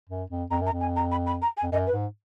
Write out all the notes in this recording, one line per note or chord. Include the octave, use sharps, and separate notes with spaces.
F#2
F2
F2 A#5
F#2 A#5
F2
G#5
A#5
B5
B5
A#5
G#5
F2
F#2 D#5
B4
G#2